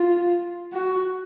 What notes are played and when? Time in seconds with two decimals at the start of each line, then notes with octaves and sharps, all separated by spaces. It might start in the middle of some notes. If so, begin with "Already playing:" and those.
Already playing: F4
0.73 F#4